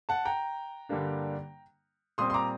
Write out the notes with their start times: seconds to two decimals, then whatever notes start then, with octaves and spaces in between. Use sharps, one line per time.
0.09 F#5 A5
0.25 G5 A#5
0.89 G2 D3 G3 A#3 D4
2.18 A#2 G3 C4 C6 D#6
2.30 C6
2.34 A#5 D6